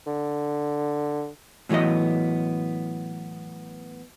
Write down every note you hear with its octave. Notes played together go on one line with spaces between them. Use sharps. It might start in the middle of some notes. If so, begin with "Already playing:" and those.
D3
A2 E3 F#3 B3 D#5